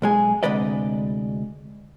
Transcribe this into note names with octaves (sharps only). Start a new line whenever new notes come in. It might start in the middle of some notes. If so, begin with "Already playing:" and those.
B1 G#3 G#4
D2 C3 G#3 B4 D5 D#5